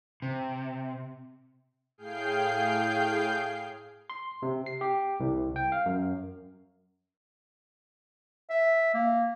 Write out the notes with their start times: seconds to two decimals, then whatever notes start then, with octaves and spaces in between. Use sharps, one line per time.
0.22 C3
1.98 A2 G#4 F5 G5 G6 C7
4.10 C6
4.42 C3
4.66 C7
4.81 G4
5.20 C2
5.56 G5
5.72 F5
5.86 F#2
8.50 E5
8.94 A#3